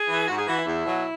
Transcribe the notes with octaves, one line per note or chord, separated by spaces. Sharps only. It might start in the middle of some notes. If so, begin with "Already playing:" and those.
Already playing: G#4
E3
G#2 F#4
G#4
E3 F#4
E4
E2
B2 F#3